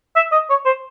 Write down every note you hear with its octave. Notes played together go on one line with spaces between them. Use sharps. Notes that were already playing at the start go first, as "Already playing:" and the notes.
E5
D#5
C#5
C5